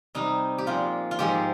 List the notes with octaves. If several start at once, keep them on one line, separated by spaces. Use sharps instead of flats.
C3 G3 D#4
G4
A#2 F3 G#3 F4
F4
G#2 F3 G#3 G4